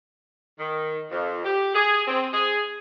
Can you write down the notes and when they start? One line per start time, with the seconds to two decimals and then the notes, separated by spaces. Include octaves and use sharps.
0.59 D#3
1.11 F2
1.44 G4
1.75 G#4
2.08 C4
2.33 G#4